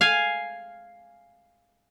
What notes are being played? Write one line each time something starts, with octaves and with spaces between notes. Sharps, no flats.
F5 G#5